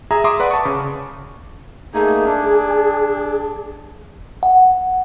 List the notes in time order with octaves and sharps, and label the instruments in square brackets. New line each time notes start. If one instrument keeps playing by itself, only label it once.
[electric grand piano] G#4 E5 G#5 A#5
E5 A#5 C6 D6 D#6
B4 D5 F#5 B5
A5 C#6
C#3
[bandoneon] A3 A#3 D#4 [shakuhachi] G#4
[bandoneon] D4
[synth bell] F#5